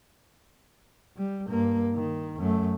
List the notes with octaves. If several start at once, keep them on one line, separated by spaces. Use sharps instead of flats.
G3
G2 A#3
D#3
F#2 A3